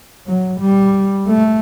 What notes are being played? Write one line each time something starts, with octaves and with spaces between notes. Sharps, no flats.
F#3
G3
A3